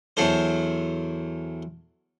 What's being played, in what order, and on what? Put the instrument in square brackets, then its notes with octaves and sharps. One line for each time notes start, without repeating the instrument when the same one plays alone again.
[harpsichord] E2 F#3 A4 C5